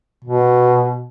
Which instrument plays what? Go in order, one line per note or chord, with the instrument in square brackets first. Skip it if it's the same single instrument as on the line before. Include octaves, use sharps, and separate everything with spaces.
[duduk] B2